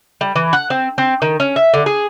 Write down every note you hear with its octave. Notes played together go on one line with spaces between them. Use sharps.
G3
E3
F#5
C4
C4
D#3
C#4
E5
D3
G#4